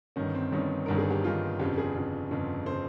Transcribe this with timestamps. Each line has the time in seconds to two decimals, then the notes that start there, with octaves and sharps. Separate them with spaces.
0.16 G1 G2 D#3 C#4
0.35 C4
0.52 G1 G2 D#3 C#4
0.86 G1 G2 D#3 A#4
0.98 G#4
1.10 G4
1.24 G1 G2 D#3 F4
1.59 G1 F2 C#3 G4
1.78 G#4
1.95 G1 F2 C#3
2.31 G1 F2 C#3
2.66 C5
2.72 C#3